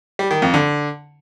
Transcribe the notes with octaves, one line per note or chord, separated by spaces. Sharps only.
G3
D#3
F2
D3